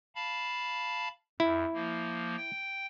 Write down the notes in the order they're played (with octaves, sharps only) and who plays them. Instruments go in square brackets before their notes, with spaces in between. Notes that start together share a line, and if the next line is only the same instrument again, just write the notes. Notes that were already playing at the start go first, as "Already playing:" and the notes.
[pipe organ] F5 A5 B5
[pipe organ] F2 [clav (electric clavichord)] E4
[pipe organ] F3 A#3
G5